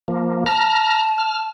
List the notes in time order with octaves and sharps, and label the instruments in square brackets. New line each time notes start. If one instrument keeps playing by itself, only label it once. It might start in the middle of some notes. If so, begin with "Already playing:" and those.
[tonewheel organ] F3 A#3
[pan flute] A5 [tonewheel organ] A#5 F6
[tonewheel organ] F6